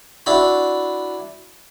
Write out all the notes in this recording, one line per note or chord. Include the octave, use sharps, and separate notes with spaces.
D4 E4 F#4 B5